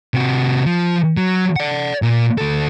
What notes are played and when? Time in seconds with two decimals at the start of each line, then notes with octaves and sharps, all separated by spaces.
0.14 C3 F#4
0.66 F3
1.17 F#3
1.56 D5 F#5
2.02 A#2
2.38 D2 A4